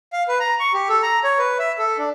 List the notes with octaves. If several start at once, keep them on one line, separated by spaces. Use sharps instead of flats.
F5
B4
A#5
C#6
G4
A4
A#5
C#5
B4
E5
A4
D4